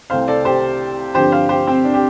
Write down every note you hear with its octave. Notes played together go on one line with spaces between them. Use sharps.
C2 C3 A3 C4 C5 F5
A4 D5
G4 C5
G2 D3 F3 C4 G4 C5
C5 F5
G4 C5
C4
D4
G4